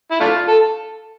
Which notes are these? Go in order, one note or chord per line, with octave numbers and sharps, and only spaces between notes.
E4
A3 D4 F4
A4